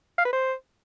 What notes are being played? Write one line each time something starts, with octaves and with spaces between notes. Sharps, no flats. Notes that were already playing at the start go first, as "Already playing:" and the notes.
F5
B4
C5